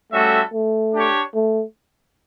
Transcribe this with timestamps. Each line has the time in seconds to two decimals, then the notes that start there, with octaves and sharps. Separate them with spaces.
0.12 G3 A3 C#4 F#4 A4 E5
0.53 A3
0.94 D4 G4 C#5
1.34 A3